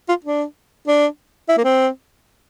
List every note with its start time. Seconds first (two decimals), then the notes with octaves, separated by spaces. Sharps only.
0.08 F4
0.25 D4
0.87 D4
1.49 E4
1.57 A#3
1.64 C4